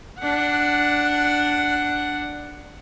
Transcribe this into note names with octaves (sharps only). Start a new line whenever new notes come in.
D4 F#5